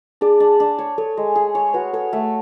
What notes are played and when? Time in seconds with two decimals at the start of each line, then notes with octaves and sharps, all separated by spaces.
0.21 D4 G#4
0.40 D4
0.60 D4
0.79 C#5
0.98 A4 C#5
1.17 G#3
1.36 G#4
1.55 C#5
1.74 F#4 B4
1.93 A4 C#5
2.13 A3 A4